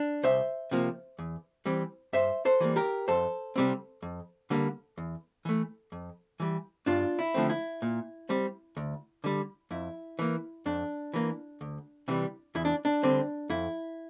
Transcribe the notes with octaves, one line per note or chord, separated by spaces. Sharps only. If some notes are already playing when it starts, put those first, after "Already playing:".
Already playing: D4
C2 C5 E5
C3 F3 A#3
E2
E3 G3 C4
G2 C5 E5
A4 C5
E3 G3 A#3
G4 A#4
F2 A4 C5
C3 G3 C4
F2
D3 G3 A#3
E2
E3 A3
F2
E3 G3
G2 D4 F4
E4
D3 F3 A3 C4
E4
A#2
G3 C4
D2
D3 G3
F2 E4
E3 A#3
F2 D4
E3 A#3
D2
C3 E3 G3
E2 E4
D4
D4
D3 G3 C4
F2 E4